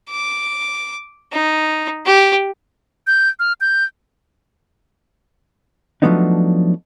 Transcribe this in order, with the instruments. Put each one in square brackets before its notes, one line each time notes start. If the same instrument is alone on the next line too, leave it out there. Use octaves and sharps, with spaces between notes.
[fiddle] D6
D#4
G4
[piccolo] G6
F6
G6
[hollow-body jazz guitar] F3 F#3 A3 B3 D4 D#4